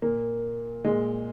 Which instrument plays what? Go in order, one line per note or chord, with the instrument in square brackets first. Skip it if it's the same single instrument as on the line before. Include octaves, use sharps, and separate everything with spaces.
[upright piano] A#2 A#3
A#2 G#3